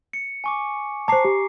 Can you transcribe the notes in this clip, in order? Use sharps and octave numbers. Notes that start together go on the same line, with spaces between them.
C#7
G#5 C#6 D6
C5 A5 A#5 D6 C7
G4